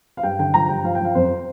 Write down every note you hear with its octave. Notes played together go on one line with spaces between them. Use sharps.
F5
G2 G5
D3 G5
F3 A#5
G2 G5
F3 F5
G5
F3 F5
F2 C5